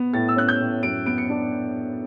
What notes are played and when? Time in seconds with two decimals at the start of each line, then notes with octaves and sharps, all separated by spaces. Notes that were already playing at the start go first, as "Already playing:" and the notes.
Already playing: B3
0.13 A2 A6
0.28 E6
0.36 C#4 F#6
0.48 G6
0.60 A2
0.83 F#2 D7
1.06 B3 D7
1.18 C#7
1.29 D4